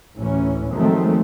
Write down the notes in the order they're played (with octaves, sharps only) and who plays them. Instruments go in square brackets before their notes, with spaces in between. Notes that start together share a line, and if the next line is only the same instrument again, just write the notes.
[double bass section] A1 D2 E3 C#4
D#3 F3 F#3 G#3 A3 C4